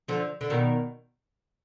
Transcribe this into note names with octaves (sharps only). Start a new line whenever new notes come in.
D3 F3
D3
B2 D#3